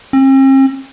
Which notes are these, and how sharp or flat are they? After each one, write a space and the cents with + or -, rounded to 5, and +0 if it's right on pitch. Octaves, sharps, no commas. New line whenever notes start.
C4 +45